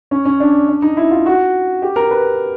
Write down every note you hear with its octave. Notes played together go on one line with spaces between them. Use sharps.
C#4
C#4
D4
D4
D#4
E4
F4
F#4
G4
A#4
B4